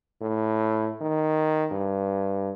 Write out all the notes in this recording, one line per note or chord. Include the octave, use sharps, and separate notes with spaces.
A2
D#3
G2